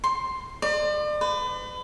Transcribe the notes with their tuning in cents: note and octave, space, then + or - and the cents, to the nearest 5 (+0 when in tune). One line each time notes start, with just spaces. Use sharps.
C6 +10
D5 +40
B4 +35